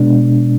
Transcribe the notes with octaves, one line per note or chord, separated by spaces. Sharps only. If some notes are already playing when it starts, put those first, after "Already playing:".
Already playing: B2 G#3 D4